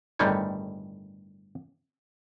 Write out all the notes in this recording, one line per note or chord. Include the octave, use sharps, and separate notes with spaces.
G1 A2 D#3 G3 G#3 C#5